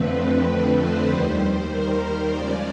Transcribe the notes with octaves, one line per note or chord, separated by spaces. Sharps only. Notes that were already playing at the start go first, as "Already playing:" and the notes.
Already playing: F2 D3 F3 A3 C4 B4
C5
D#2 D#3 G3
C5
A#4
C5
C#3 F3 G#3 D5